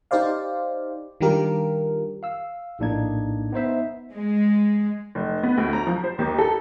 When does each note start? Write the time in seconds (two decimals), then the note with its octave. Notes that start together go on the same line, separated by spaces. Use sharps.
0.11 D#4 G4 C5 D5 F5
1.21 D#3 G3 D4 F4 G4 A#4
2.23 F5 E6
2.79 A#1 A2 A#3 D4 D#4 G#6
3.52 B3 D#4 C5 E5
4.13 G#3
5.15 F1
5.43 B3
5.58 D2
5.73 A#5
5.87 F3
6.04 C5
6.18 D#2
6.38 A4